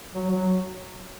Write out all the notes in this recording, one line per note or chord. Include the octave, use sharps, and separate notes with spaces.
F#3
F#3